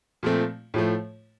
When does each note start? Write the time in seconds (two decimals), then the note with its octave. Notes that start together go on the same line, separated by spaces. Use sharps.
0.23 A#2 F3 A3 C4
0.74 A2 F3 A3